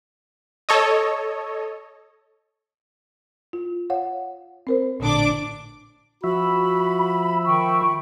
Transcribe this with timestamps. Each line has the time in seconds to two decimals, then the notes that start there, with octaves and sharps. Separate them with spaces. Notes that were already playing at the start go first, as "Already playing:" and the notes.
0.69 A4 C#5 D#5
3.53 F4
3.90 C#5 F5 F#5
4.67 C4 A#4 C5
5.00 A1 A#2 D3 D4 D6
6.24 F3 F#4 E5 B5
7.45 D#3 G5 B5 C#6